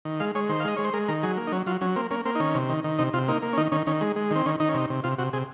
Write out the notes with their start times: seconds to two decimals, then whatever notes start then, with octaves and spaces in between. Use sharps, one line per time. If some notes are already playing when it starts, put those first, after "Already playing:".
0.05 D#3
0.20 G#3 F5
0.35 G#3 C#5
0.49 D#3 C5
0.60 F5
0.65 G#3 D#5
0.77 G#3 C#5
0.85 C5
0.93 G#3 A#4
1.08 D#3 A#4
1.23 F#3 G#4
1.37 A#3
1.47 D#4
1.52 F#3 C#4
1.66 F#3 F4
1.81 F#3 C#4
1.96 A#3 C4
2.11 A#3 C#4
2.25 A#3 C4
2.35 D#4
2.40 D#3 C#4
2.55 C3
2.69 D#3
2.84 D#3
2.99 C3 D#4
3.13 C3 F4
3.28 A#3 D#4
3.42 A#3
3.53 C#4
3.58 D#3 D#4
3.72 D#3 C#4
3.87 D#3 C#4
4.01 G#3
4.16 G#3
4.31 D#3 C4
4.46 D#3 C#4
4.60 D#3 D#4
4.69 C#4
4.74 C3 D#4
4.90 C3
5.04 C3 F4
5.18 C3 F#4
5.33 C3 G#4